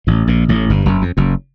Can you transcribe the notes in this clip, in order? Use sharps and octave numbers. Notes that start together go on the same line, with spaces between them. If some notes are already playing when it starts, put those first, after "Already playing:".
A1 A2
A#1 A#2
A1 A2
G1 G2
F#1 F#2
F2
F#1 F#2